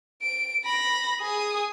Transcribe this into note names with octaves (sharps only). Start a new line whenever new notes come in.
D7
B5 A#6
G#4 D#6